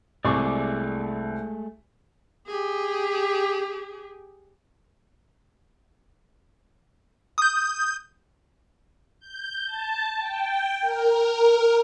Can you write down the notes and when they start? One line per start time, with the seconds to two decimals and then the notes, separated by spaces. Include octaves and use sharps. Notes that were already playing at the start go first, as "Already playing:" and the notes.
0.25 C2 G#3 A3 G#4 D5 C#6 D6
2.47 G4 G#4
7.38 D#6 G6
9.20 G6
9.65 A5
10.19 G5
10.81 A#4